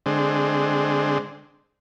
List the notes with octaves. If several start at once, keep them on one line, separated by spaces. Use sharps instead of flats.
D3 G#3 C4